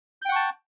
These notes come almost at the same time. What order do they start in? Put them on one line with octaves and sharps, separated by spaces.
G6 G5 F#5 C#6 A5